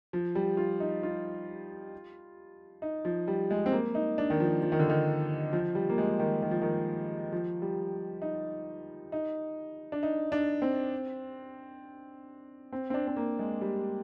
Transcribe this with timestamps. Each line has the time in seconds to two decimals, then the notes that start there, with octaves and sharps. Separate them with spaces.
0.13 F3
0.35 G3
0.57 F4
0.80 D#4
1.03 F4
2.82 D#4
3.05 F3
3.28 G3
3.51 G#3
3.66 C4
3.72 A#3
3.95 D#4
4.18 D4
4.30 D#3
4.40 F3
4.62 F3
4.72 D#3
4.79 D3
4.90 D#3
5.53 F3
5.75 G3
5.89 A#3
5.98 G#3
6.19 D#3
6.42 D#3
6.51 F3
6.62 D#3
7.33 F3
7.62 G3
8.22 D#4
9.12 D#4
9.92 D4
10.03 D#4
10.32 D4
10.62 C4
12.73 C4
12.90 C4
12.94 D4
13.07 C4
13.16 A#3
13.39 G#3
13.61 G3